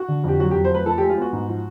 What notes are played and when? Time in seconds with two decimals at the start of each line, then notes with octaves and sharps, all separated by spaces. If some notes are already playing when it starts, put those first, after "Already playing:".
Already playing: F#4
0.08 D3
0.24 F2 G4
0.40 F#3 F#4
0.51 F2 G4
0.65 C5
0.70 A3 B4
0.86 F3 A4
0.98 G#3 G4
1.09 F4
1.18 B3 F#4
1.32 G#2
1.48 F3